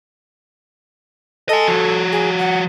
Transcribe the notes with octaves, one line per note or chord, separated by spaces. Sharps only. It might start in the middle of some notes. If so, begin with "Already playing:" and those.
A4 D#5 G#5
F3 F#4
G#4
F#5